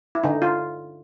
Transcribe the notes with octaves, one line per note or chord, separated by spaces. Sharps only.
E4
D3 D#4
F4